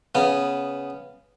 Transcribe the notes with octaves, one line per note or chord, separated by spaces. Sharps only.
C#3 B3